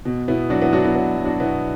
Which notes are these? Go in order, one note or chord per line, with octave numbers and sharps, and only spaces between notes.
B2
B2 B3 E4
F#3 D4 F#4
B3 E4
F#3 D4 F#4
B3 E4
B2 B3
F#3
D4 F#4
B2 B3 E4